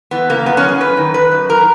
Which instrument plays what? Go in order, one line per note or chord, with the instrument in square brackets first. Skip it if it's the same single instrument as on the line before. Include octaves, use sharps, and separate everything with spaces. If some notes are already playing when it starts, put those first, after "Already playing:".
[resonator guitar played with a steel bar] E3 B3
C#3 A#3
F#2 B3
C#4
E3 G#4
F#2 B4
D#3
D#3 B4
F#2
E3 A#4